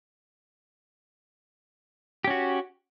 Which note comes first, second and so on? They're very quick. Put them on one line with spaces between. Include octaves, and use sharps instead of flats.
G4 C#4 F#4